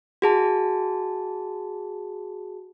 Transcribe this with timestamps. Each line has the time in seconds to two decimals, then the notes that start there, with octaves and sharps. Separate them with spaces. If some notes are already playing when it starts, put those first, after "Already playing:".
0.22 F#4 G#4 A5